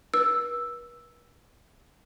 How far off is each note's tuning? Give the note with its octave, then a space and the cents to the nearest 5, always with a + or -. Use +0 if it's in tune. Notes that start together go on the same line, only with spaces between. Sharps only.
B4 -40 E6 +0